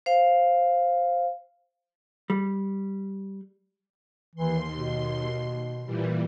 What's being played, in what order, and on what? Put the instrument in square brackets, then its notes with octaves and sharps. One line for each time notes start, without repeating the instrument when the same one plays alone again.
[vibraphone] C5 F5
[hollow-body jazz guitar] G3
[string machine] D#2 C6 [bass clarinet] E3
[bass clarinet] B2
[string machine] A#2 E3 G3